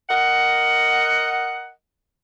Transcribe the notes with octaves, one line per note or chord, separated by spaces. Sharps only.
A#4 D#5 F#5